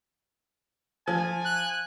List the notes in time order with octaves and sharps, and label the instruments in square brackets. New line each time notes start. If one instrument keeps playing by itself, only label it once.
[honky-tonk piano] F3 [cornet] G#5
[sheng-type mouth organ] F#6